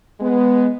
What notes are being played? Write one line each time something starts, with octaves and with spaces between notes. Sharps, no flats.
G#3 B3